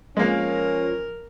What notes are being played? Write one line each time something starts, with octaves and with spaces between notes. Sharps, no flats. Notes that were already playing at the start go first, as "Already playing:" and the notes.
F3 G#3 A#3 C#4 A#4